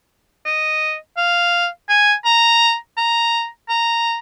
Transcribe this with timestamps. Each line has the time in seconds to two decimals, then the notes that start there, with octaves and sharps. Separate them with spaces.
0.45 D#5
1.17 F5
1.89 G#5
2.25 A#5
2.97 A#5
3.69 A#5